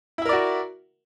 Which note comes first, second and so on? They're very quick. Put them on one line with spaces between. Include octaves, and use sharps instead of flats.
E4 E5 A#4 D5 F#4